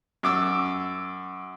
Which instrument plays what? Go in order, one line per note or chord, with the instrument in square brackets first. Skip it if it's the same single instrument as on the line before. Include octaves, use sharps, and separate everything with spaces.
[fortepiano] F#2 D6 E6